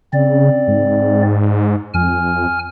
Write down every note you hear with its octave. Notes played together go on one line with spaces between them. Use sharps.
C#3 C4 D5
G#2
F2 G#5 F6